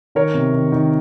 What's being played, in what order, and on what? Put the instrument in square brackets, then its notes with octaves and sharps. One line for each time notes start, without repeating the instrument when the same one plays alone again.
[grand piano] D#3 A#4 C#5
C3
D#3
D#3